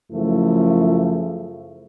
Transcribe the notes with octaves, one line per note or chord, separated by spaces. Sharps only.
F#2 C#3 F3 A3 E4